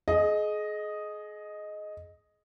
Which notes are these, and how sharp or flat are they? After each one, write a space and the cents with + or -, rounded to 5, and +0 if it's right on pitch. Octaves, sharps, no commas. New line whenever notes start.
G#4 +30 D#5 +0